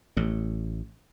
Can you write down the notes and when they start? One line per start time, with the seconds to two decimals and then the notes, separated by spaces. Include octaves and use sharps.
0.17 A1 A2